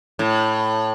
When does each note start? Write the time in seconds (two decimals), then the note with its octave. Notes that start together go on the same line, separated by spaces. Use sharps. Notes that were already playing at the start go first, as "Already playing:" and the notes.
0.19 A2